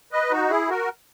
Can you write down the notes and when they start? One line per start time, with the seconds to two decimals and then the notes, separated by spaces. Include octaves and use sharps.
0.12 B4 D#5
0.31 D#4 F#4
0.50 E4 G#4
0.69 F#4 A#4